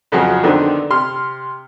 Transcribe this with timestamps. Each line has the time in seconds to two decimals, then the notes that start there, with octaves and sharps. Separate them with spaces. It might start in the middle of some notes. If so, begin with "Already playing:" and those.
0.12 F2 C#3 F3 F#3 G#4 F#5
0.43 D3 D#3 B3 C4 D4 D#4
0.90 C3 C6 F6